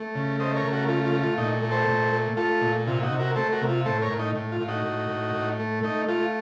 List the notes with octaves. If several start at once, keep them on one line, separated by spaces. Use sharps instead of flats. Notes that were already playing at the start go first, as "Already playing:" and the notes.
Already playing: A3
C#3
A3 C5 D#5
A#4 C#5
C#3
F#4 A#4
A3 F4
F4
A3
F4
A#2 D#4
A3
A4 C5
A#2
A3
A3 F4 A4
A#2
C3 F4
D#4 F#4
C3
F#4 A#4
A3 A4 C5
F#4 A#4
C3
F4
A2 A4 C5
A#4 C#5
A2
D#4
A2
F4
A2
D#4 F#4
A2
A2
A2
A3
A3 D#4
A3 F4